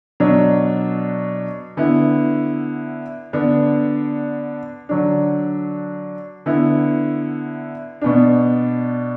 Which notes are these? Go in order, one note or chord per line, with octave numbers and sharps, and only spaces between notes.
B2 F#3 D4
D3 B3 E4
D3 B3 D4
D3 F#3 D4
D3 B3 E4
B2 B3 D4